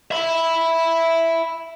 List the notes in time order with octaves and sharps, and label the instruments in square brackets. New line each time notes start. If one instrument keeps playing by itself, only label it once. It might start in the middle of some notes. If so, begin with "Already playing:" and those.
[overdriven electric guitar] E5 B5